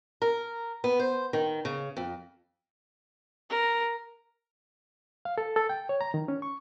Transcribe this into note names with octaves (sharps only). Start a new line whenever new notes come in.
A#4
B3
C5
D#3
C#3
F2
A#4
F5
A4
A4
G5
C#5
A#5
D#3
C#4
C#6